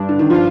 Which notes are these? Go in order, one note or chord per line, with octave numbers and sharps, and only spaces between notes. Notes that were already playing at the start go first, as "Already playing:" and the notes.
Already playing: G2 D4
D3
D#3
F3 F4